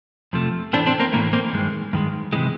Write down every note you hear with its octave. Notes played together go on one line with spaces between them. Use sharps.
F2 C3 F3 A3
A2 E3 A3 C4 D4
C4 D4
A#3 C4
A2 E3 A3 A#3
A#3 C4
G2 D#3 G#3
G2 D#3 G#3
C3 E3 G#3